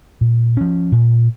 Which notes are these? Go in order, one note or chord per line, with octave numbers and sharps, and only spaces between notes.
A#2
F3 C#4
A#2